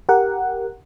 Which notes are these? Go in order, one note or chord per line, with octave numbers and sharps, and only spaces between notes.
G4 A#4 F#5